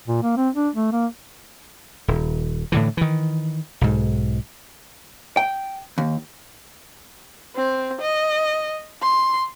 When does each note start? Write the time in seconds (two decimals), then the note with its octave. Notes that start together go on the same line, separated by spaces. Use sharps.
0.08 A#2
0.22 A#3
0.37 C4
0.55 D4
0.75 A3
0.92 A#3
2.08 D#1
2.72 A2 D3 E3
2.97 D#3 E3
3.81 B1 G#2
5.37 G5
5.98 D#2
7.56 C4
8.01 D#5
9.02 C6